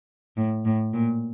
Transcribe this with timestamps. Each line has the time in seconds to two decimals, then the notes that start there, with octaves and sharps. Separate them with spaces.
0.37 A2
0.65 A2
0.94 A#2